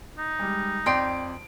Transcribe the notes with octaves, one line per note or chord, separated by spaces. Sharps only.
D#4
G3 G#3
F2 D5 G5 C6 D7